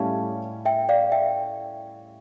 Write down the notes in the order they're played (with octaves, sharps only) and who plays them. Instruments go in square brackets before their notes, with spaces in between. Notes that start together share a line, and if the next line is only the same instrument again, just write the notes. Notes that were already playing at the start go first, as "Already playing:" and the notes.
Already playing: [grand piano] A2 G3 C#4 E4 G4 [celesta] F5 A5
[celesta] E5 G5
D5 F5
E5 G5